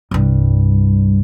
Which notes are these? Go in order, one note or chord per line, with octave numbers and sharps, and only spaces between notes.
C2 G2